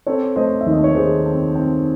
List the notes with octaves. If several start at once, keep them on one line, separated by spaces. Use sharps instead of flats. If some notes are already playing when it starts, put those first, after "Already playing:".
C4 A4 C#5
A3 C5 D#5
E5
D#2
D#5
C#5
D#3 G#4 C5
C4
C4